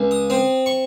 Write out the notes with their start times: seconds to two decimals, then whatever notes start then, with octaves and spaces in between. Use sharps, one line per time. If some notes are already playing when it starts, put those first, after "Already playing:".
Already playing: C#2
0.11 D#6
0.30 C4 D#6
0.66 C#6